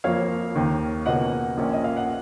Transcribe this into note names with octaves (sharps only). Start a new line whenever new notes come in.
F2 F3 A#3 C#5 F5
D#2 D#3 A#3
C#2 B2 A#3 C#4 D#5 F#5
A#1 A#2 F3 A#3 C#4
D#5
F5
F#5